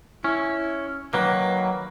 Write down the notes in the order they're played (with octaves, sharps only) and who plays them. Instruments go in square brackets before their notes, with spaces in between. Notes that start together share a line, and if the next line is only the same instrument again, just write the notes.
[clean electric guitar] C#4 [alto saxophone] E4
[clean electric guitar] D#3 F#3 A#3 [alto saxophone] B4